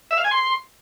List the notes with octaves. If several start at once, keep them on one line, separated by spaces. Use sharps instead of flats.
E5
F5
G#5
C6